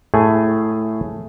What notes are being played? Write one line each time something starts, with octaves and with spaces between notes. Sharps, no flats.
A2 A3 G#4 G#5